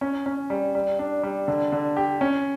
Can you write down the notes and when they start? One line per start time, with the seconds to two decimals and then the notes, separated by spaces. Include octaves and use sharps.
0.01 C#4
0.26 C#4
0.50 G3
0.75 G3
0.99 D4
1.23 G3
1.48 D3
1.72 D3
1.97 G4
2.21 C#4